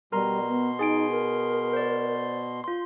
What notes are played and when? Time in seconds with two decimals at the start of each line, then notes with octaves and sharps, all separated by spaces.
0.12 B2 G3 A#4 A#5 C6
0.48 B3
0.79 D#4 G#4 G#5 D7
1.11 A#4
1.73 C5 D5
2.64 F4 C6